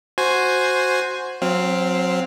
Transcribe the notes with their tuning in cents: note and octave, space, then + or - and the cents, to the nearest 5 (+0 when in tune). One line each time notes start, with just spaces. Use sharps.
F#4 -5 C5 +0 G#5 +0
F#3 -30 C4 +0 F5 +0